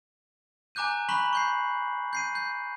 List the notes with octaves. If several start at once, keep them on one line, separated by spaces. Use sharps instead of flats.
G#5 A#5 D6 F#6 G6 D#7
A#5 B5 C#6 F#6 B6 F#7
C#6 G6 C7
G6 C7 D#7
G6